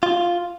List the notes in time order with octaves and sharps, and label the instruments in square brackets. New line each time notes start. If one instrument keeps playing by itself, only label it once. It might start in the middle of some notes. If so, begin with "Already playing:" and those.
[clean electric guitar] F4